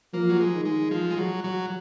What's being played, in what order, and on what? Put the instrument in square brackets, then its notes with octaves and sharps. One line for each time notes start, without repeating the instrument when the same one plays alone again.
[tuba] F3 [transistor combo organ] A#3
[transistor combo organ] F#3
G#3
[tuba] D#3
[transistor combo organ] G#3
F3
G#3
F#3
F#3